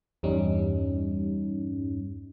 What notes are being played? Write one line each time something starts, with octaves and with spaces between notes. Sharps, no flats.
E2 G2 G3 C#4 D#4